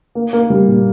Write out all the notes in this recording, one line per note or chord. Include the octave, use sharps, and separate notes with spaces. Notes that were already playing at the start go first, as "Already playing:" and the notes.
A#3
A#3
G3
A#2